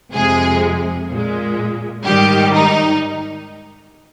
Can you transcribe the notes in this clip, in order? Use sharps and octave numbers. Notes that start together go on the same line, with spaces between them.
F2 C3 F3 G#3 G#4
A#2 G#3
G#2 D#3 G3 G4
D#4